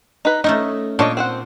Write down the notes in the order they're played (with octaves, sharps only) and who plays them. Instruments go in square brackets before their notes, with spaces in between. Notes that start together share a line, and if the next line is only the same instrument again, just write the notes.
[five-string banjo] D#4 B4
[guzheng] A3 C#4 D#4 [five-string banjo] D#5
[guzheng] A#2 C6 [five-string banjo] D4 C#5 D#5
[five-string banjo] C4 C5 F#5